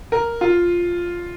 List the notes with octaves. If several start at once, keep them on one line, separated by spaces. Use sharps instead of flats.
A#4
F4